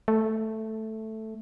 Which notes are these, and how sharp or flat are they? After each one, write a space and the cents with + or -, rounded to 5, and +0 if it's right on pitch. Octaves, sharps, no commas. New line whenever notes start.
A3 +0